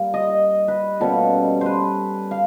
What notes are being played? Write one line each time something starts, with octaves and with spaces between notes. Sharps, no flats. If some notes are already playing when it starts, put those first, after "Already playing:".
Already playing: G3 A#3
D#5
B4
B2 G3 A#3 C#4 A4
B4 C5
F5